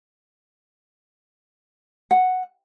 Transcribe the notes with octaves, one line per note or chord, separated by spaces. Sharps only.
F#5